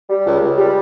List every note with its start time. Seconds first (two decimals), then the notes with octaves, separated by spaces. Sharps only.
0.09 G3
0.26 C#2
0.41 C#2
0.58 G3